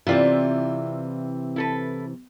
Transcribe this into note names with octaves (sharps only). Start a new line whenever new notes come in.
C3 E3 C4 E4 F4 D5
E4 A4 B4